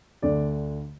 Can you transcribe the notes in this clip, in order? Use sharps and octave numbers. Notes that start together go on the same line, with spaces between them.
D2 D3 D5